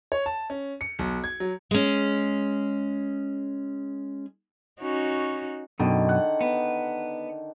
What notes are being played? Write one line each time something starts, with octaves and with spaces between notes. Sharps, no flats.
C#5
A5
C#4
C#7
B1
G#6
F#3
G#3 C#4
C#4 D#4 F#4
F#2 B2 D3 D#3
F#5
B3